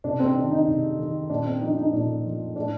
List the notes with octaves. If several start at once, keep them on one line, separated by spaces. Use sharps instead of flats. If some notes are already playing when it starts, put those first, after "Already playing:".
C3 D4
C4
D#3 D4
D#4
C3
D#3
A#2 D4
C4
F3 D#4
D#4
A#2 D4
F3
A2 D4